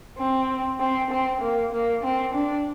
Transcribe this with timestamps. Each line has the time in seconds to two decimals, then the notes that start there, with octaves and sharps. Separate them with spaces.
0.18 C4
0.80 C4
1.11 C4
1.41 A#3
1.73 A#3
2.03 C4
2.34 D4